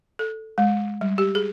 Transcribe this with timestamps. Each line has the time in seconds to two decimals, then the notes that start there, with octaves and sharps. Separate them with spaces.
0.19 A4
0.58 G#3
1.01 G3
1.18 G4
1.35 G#4